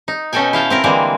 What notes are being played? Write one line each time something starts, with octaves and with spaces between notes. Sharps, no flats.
D#4
B2 C#4 D#4 A4 G5 G#5
E4 F5 G5 A5
C4 E4 A#4
D3 E3 G3 G#3 A#3 C4